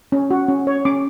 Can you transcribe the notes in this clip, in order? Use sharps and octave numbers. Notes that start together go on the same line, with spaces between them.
C#4
F#4
C#4
C#5
C#4 D6